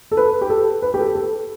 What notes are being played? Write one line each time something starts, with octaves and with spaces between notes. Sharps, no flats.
A4
B4
G4
A4
B4
G4
A4
A4